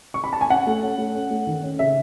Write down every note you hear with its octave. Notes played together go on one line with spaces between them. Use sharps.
C#6
B5
A5
G#5
C#4 F#5
A3
C#4
A3
C#4
A3
D#3
C#4
C#3 E5